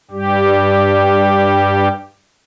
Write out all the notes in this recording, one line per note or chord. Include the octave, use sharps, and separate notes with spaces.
G2 G3 G4